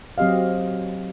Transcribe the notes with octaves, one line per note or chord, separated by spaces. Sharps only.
F#3 C4 G4 D#5 F5